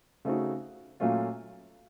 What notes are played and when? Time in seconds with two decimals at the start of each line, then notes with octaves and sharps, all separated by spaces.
0.25 C#3 A3 C4 D#4 F#4
1.00 A#2 F#3 A3 C#4 F4